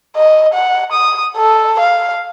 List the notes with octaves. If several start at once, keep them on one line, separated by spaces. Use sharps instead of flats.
D#5
F#5
D#6
A4
F5